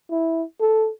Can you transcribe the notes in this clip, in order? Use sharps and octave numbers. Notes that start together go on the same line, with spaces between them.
E4
A4